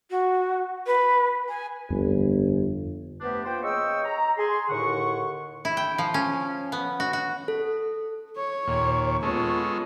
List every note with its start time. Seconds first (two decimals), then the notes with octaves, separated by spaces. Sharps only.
0.10 F#4
0.86 B4
1.48 G#5
1.91 G1 F2
3.21 C3 A3 B3 D4 G4 B4
3.45 F3 A#3 B4 C5 G5
3.63 C#3 G#4 D#5 G5 C#6 E6
4.05 A#5
4.38 G#4 C6
4.70 D#2 A2 D3 F#5 C#6
5.65 E4
5.77 G5
5.98 F3
6.14 C#4
6.72 B3
7.00 F#4
7.13 F#4
7.48 A4
8.36 C#5 C#6
8.68 D#2 A#2
9.23 G#3 B3 C#4 F4 A4